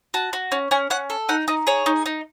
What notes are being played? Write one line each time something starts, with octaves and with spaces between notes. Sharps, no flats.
F#4 A5
F#4
C#4
C#4 G#5
C#4 F#5
A4
D#4 F#5
D#4 D#5
G#4 C#5
D#4
D#4